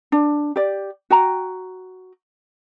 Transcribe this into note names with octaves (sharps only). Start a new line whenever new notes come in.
D4
G4 D5
F#4 G5 A#5